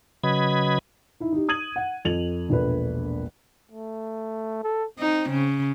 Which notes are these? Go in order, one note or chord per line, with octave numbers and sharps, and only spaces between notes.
C#3 F#3 B4 D#5 B5 G#6
D#4 E4
D#4 G4
D#6 G#6 D#7 F#7
F#5
F2 A4 F7 F#7
E1 A#1 A#2 A4 B4
A3
A4
C4 D#4
C#3